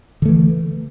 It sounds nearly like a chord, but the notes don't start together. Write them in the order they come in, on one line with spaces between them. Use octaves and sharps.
D3 A3 E3